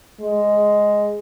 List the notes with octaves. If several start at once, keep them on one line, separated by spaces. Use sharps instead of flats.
G#3